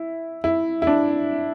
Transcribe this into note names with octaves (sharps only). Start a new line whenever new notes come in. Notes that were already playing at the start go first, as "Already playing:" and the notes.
Already playing: E4
E4
E4
D4